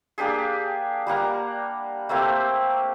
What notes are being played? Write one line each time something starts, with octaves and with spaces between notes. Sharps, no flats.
A#3 D4 G4 G#4
G3 A#3 F#5 A#5
A3 A#3 C4 G4